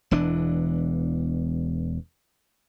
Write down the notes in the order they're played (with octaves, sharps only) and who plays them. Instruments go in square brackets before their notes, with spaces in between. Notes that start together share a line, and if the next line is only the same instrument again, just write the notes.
[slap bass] E1 E2 E3 D4